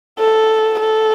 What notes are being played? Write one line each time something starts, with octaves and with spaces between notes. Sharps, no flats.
A4
A4